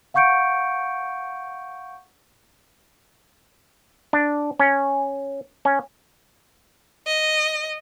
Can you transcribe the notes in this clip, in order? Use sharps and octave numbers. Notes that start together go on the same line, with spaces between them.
F5 F#5 C#6 G6 C#7 D7
D4
C#4
C#4
D#5